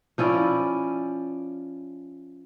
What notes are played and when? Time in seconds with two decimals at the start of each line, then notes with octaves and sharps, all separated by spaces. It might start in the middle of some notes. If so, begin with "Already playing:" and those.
0.18 F3 C#4 E4 D5